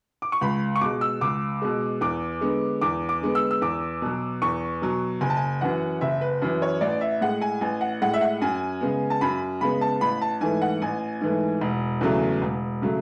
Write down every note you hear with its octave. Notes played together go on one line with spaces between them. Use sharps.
D6
C#6
C#2 B5
C#6
B2 G#3 D6
E6
C#2 D6
B2 G#3
E2 D6
D3 G#3 B3
E2 D6
D6
D3 G#3 B3
E6
E6
E2 D6
B2 F#3
E2 C#6
B2 F#3
F#1 G#5
A5
G#5
F#2 E3 F#5
F#1 E5
B4
F#2 E3
C#5
A1 D5
E5
A2 G#3 F#5
G#5
A1 G#5
F#5
A2 G#3 F#5
E5
F#5
F#2 G#5
C#3 G#3 B3
A5
F#2 B5
C#3 G#3 B3 B5
A5
A1 B5
A5
G#2 E3 A3 G#5
F#5
A1 G#5
G#2 E3 A3
E1
E2 C#3 F#3 A3
E1
C#3 F#3 A3